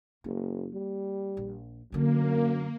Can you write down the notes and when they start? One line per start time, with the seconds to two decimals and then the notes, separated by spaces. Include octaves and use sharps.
0.24 F#1 A#3
0.73 G3
1.37 A#1
1.92 F#2 D3 F#3 A#3